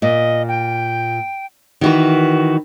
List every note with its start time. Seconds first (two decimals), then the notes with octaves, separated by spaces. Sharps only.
0.02 A#2 D#5
0.48 G5
1.81 D#3 E3 F#4 B4